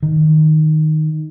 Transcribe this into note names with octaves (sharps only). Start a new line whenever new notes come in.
D#3